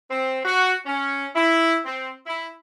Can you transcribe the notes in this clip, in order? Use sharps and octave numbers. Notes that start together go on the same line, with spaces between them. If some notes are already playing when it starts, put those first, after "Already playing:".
C4
F#4
C#4
E4
C4
E4